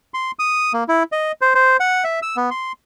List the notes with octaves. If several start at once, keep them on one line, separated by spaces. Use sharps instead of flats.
C6
D#6
A#3
E4
D#5
C5
C5
F#5
E5
E6
B3
C6